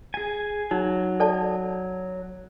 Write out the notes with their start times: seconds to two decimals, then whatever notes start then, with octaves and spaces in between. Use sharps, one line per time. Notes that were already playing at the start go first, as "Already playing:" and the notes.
0.14 G#4 G#5
0.71 F#3 D#4
1.20 A4 D5 A5